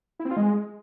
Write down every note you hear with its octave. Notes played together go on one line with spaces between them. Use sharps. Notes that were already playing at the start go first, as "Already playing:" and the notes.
E4
C4
F4
G#3